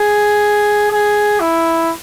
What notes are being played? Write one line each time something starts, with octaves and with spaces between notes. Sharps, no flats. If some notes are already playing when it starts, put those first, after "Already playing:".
Already playing: G#4
G#4
E4